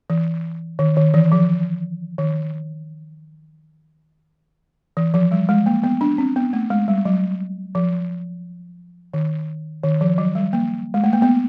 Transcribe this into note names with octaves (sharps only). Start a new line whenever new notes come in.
E3
D#3
D#3
E3
F3
D#3
E3
F3
G3
G#3
A#3
B3
D4
C4
B3
A3
G#3
G3
F#3
F3
D#3
D#3
F3
F#3
G3
A#3
G#3
A3
A#3
B3